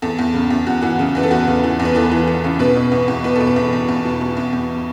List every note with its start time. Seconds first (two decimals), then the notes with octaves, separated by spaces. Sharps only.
0.02 E2 A4
0.19 E2
0.34 C#3
0.50 E2
0.67 E2 F#4
0.81 E3 F#4
0.99 C#3
1.15 E2 B4
1.23 A4
1.31 E2 F#4
1.47 C#3
1.64 E3
1.80 E2
1.85 B4
1.95 E3 A4
2.12 E3
2.27 E3
2.44 C#3
2.59 B2 B4
2.76 B2
2.92 E2
3.08 E2
3.24 B2 B4
3.36 B2 A4
3.47 B4
3.56 E2
3.73 E2
3.89 E2
4.05 B2
4.21 B2
4.37 E2
4.53 E2